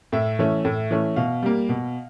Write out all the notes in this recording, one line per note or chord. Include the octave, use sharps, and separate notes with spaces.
A2 E5
E3 A3 C#4
A2
E3 A3 C#4
B2 F5
G3 A#3
B2